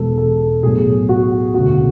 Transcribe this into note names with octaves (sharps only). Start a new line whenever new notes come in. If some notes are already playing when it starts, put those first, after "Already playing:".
Already playing: E1 E2 B2 G#3 A4
A4
B1 A2 F#3 G#4
F#4
E1 D2 C#3 F#4